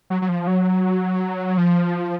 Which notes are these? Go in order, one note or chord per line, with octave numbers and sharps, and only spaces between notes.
F#3
F#3
F3
F#3
F3